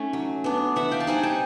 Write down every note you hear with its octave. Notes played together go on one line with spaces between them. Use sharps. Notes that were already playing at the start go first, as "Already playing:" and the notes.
Already playing: A3 C#4 D#4
F#3
B3 D4
E3 E5 F#5
F5 G5
A5
G3 C4 D#4 F#5 G#5
G5 A5